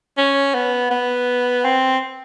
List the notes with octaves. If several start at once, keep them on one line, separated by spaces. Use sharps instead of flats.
C#4
B3
B3
C4